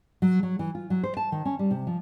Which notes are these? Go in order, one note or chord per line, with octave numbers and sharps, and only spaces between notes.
F#3
F#3
E3
F4
F#3
C5
A5
D#3
C#4
G3
C3
F3